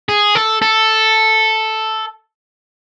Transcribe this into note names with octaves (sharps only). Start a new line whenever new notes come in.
G#4
A4
A4